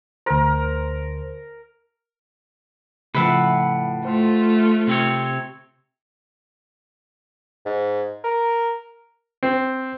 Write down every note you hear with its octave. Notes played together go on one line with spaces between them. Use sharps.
D2 A#4 C5
A2 C#3 F3 B4 E5 F#5
A3 F4 C5 C6
C3 C4 C#5
G#2
A#4
C4